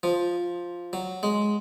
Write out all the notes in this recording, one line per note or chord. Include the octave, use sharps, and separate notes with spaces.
F3
F#3
G#3